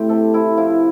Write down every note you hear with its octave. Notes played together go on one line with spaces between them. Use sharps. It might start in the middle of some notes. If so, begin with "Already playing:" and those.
Already playing: A2 A3 C4 E4 G4
C3 A4
C3 E4
F3 E4